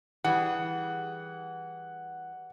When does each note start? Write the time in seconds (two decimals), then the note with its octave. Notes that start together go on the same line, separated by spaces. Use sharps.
0.24 E3 G3 G#4 F#5